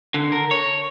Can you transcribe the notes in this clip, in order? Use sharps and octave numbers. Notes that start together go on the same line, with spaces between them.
D3
A#4
C#5